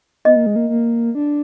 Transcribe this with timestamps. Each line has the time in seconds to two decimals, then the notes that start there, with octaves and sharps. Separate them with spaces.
0.25 B3 D#5
0.36 A#3
0.46 G#3
0.56 A#3
0.69 A#3
1.15 D4